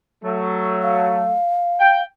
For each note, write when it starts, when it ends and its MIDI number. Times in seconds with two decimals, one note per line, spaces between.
0.24 1.35 54
0.24 1.35 57
0.82 2.02 77
1.80 2.02 79